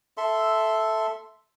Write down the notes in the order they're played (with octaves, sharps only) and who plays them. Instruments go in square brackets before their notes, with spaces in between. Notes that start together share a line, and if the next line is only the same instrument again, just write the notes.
[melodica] A4 E5 C6